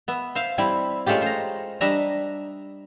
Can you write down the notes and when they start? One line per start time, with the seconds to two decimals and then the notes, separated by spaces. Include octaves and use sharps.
0.08 B3 E5
0.35 C5 E5 F5
0.58 G3 C4 E4
1.06 G#3 A3 C#4 F4 G4
1.22 C5 A#5
1.81 G3 D4 D#5 E5 A#5